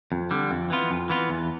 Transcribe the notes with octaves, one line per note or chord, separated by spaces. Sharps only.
F2
D3 G3
F2
E3 B3 F4
F2
E3 B3 F4
E2